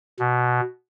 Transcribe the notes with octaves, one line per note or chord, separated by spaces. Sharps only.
B2